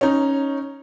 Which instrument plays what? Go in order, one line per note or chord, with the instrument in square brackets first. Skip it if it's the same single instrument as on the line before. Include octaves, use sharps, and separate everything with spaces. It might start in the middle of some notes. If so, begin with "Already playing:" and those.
[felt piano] C#4 D#4